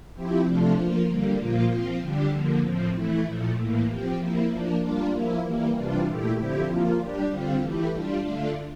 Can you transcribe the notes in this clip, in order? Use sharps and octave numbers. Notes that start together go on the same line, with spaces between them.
F3 C4 E4 G4
C3 F3 A3 D4 F4
F3 A#3 F4
D3 G3 A#3
A#2 F3 A#3 F4
F3 C4 F4
D3 G3 D4 G4
D3 F3 A#3
A2 F3 C4
E3 A3 E4
A#2 F3 A3
A2 E3 A#3
F3 C4 G4
F3 A#3 E4
F3 A#3 D4
G3 A#3 D4 F4
F3 A#3 E4
E3 G3 A#3
C3 E3 G3 D4 F4
A#2 A3 E4 G4
D3 F3 C4 E4 G4
F3 A#3 F4
G3 D4 G4
D3 G3 C4 F4
E3 A3 E4 G4
G3 D4 F4
D3 A3 D4 F4